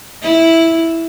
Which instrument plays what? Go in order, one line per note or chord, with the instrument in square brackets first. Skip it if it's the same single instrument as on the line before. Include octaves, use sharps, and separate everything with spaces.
[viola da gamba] E4